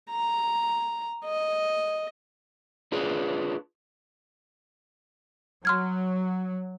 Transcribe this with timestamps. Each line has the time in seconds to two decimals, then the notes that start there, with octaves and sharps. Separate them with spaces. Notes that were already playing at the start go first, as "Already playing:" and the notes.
0.10 A#5
1.24 D#5
2.92 D4 F4 G#4 B4
5.65 F#3 C6 F6 G#6